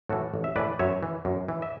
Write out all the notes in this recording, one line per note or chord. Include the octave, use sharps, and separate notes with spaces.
A2 E3 F#4 A4
A1
E5
A2 E3 B4 D5
F#2 C#5 E5
E3
F#2
E3
E5